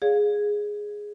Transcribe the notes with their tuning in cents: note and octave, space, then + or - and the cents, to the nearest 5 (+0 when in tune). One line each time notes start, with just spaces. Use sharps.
G#4 +0 C#5 +45 F5 +25